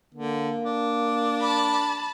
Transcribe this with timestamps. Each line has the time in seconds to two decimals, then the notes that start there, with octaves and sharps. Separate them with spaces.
0.14 D3 A#3
0.63 D4
1.41 A5 B5